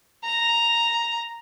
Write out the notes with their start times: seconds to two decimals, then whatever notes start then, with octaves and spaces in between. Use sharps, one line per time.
0.24 A#5